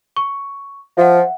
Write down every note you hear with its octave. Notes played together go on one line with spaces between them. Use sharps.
C#6
F3 E5 F#5